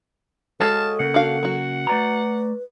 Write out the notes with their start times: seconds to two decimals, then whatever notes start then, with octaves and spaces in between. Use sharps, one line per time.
0.61 G#3 F#4 A4 C#5 D#5 F5 A5
1.00 C#3 A#3 F#5
1.14 D4 F#4 F5
1.43 F#3 F#4
1.87 A3 B4 D5 A#5